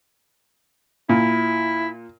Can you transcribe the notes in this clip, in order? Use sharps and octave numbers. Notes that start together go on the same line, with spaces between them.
A#2 E4